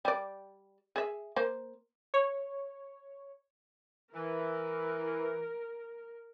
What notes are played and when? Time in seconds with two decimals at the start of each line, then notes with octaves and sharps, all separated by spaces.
0.05 G3 D5
0.96 G#4 E5
1.36 A#3 C5
2.14 C#5
4.14 E3 A#4